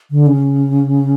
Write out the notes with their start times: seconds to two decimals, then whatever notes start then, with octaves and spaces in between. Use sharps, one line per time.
0.11 D3
0.26 C#3